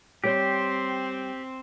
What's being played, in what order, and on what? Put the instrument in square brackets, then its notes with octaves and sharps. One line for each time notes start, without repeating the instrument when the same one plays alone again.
[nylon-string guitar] G3 C#5 [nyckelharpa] C4 C5 [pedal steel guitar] G4